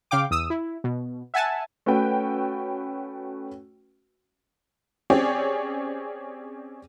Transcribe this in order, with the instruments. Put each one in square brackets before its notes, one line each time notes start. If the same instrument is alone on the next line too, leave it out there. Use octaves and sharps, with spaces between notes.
[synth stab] C#3 F5 G5 D6
E2 D#6 E6
E4
B2
E5 F#5 G#5 A5
[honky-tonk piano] A3 C#4 F#4 B4 G5
C4 C#4 G4 G#4 C#5 D5